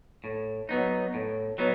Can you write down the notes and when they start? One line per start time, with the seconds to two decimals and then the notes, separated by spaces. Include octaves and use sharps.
0.24 A2
0.69 F#3 B3 D#4
1.14 A2
1.58 F#3 B3 D#4